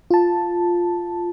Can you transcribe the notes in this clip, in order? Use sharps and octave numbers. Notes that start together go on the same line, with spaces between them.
F4 A5